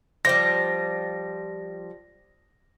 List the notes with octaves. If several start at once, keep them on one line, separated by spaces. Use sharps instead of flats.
F3 G3 C5 D5 G5 A#6